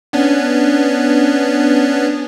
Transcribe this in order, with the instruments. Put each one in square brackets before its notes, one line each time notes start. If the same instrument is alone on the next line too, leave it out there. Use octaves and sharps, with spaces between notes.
[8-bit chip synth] B3 C#4 D4